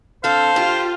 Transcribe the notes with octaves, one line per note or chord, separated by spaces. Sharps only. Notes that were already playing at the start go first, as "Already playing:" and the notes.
D3 C4 A4 C5 F5
F4 G4